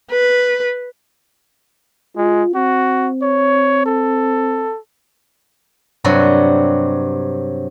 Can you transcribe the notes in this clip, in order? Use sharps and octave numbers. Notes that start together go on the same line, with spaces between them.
B4
G#3 F4
C4 F#4
C#5
A4
G2 C3 F#3 F#4